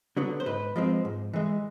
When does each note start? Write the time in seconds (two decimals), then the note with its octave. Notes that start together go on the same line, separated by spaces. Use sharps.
0.17 D3 F#3 B3
0.40 C5
0.46 G#2 B4
0.76 F3 G#3 C4
1.05 G#2
1.33 E3 G#3